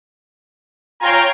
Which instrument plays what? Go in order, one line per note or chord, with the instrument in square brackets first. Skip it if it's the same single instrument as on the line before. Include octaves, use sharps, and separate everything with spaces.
[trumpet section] F4 A#5 [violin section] C#5 G5 G#5